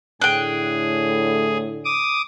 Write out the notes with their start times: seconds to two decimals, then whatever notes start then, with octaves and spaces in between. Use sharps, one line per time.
0.21 A2 D3 G#4 G5 F#6
1.85 D6 D#6